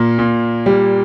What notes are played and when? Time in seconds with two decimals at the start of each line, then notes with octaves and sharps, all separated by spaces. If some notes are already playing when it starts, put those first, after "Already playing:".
Already playing: A#2 A#3
0.19 A#2
0.66 G3